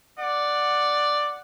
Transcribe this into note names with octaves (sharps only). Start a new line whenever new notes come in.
D5 F#5